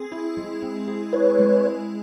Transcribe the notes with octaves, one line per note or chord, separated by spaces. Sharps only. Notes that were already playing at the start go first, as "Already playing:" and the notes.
Already playing: C4 G#4
E4
G#3
C4
G#4
E4 B4 C#5
G#3